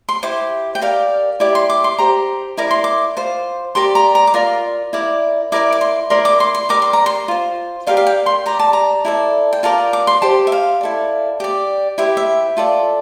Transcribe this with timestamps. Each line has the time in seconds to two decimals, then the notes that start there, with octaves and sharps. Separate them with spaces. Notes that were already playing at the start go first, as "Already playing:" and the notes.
0.09 C6
0.23 E4 G4 C5 D6
0.75 G5
0.81 G4 A#4 D5 F5
1.40 E4 G4 D5 D6
1.55 C6
1.70 D6
1.84 C6
1.98 G4 C5 A#5
2.57 E4 A#4 D5 D6
2.71 C6
2.84 D6
3.17 F4 C5
3.75 G4 A#4 D5 C6
3.95 A#5
4.15 A#5
4.27 D6
4.34 F4 A#4 D5 C6
4.93 E4 A#4 D5
5.52 E4 A#4 D5 D6
5.72 D6
5.81 C6
6.10 E4 A#4 D5 C6
6.25 D6
6.40 C6
6.55 C6
6.69 G4 A#4 D5 D6
6.82 C6
6.93 A#5
7.06 C6
7.28 F4 C5
7.87 G4 A#4 D5 F5
7.97 F5
8.07 G5
8.26 C6
8.46 G4 D5 A#5
8.59 A5
8.73 A#5
9.05 E4 A4 D5
9.53 G5
9.63 F4 A#4 D5 A5
9.93 D6
10.07 C6
10.22 G4 C5 A5
10.47 E5
10.52 F5
10.81 E4 A4 D5
11.40 G4 D5
11.98 E4 G4 C5 E5
12.17 E5
12.57 F4 A4 D5